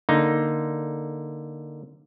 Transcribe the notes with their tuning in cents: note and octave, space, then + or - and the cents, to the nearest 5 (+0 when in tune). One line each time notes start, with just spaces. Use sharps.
D3 +0 A#3 +0 D#4 +0